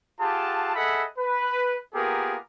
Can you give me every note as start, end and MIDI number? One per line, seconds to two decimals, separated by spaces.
0.20 0.73 65
0.20 0.73 67
0.20 0.73 68
0.20 0.73 78
0.20 0.73 81
0.75 1.04 68
0.75 1.04 69
0.75 1.04 75
0.75 1.04 76
0.75 1.04 78
0.75 1.04 83
1.18 1.76 71
1.95 2.36 58
1.95 2.36 59
1.95 2.36 65
1.95 2.36 67
1.95 2.36 68
1.95 2.36 70